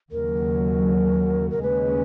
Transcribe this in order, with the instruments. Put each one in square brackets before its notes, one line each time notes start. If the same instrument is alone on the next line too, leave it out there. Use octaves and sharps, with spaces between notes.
[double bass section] D#2 C#3 F#3 [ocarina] A#4
[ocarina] A#4
[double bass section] D#2 C#3 G#3 C#4 [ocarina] B4